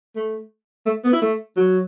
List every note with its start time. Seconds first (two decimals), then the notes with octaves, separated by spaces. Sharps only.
0.16 A3
0.86 A3
1.04 B3
1.13 E4
1.22 A3
1.57 F#3